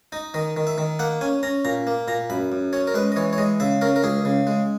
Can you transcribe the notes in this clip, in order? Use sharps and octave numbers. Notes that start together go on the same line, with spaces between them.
D#4 D#5
D#3 D#5
D#3
E5
D#3
A#3 F#5
C#4 G#5
C#4 A#5
A#2 A#5
A#3
A#2 A#5
F#2 B5
F#2
C#4 C#5
A#4
G#3 B4
D#5
E3 C#5
C#5
G#3 D#5
C#3 E5
C#4 A#4
A#4
C#2 G#4
C#3
G#3